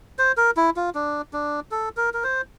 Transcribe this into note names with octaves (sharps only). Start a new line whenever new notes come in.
C5
A#4
E4
F4
D4
D4
A4
A#4
A#4
C5